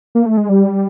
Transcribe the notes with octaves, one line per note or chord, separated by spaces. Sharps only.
A#3
A3
G#3
G3